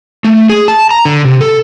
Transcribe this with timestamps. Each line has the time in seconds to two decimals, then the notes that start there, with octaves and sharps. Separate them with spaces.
0.24 A3
0.49 G#4
0.68 A5
0.91 A#5
1.05 D3
1.24 C3
1.41 A4